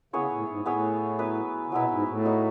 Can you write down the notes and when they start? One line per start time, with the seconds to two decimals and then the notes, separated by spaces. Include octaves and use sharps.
0.13 C#3 B3 E4 G#4 C#5
0.32 A2
0.48 G#2
0.66 A2 B3 E4 G#4 C#5
1.19 F#3 B3 E4 B4
1.67 C#3
1.72 B2 F#3 B3 E4 B4
1.91 G#2
2.08 A2
2.25 B3 D#4 F#4